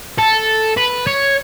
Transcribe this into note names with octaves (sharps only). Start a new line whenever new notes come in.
A4
B4
C#5